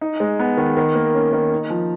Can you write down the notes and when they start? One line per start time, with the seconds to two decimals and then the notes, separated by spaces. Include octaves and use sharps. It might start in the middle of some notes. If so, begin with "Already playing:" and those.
0.01 D#4
0.20 G#3
0.40 B3
0.57 D#3
0.77 D#3
0.95 A#3
1.14 C#4
1.33 D#3
1.52 D#4
1.70 F3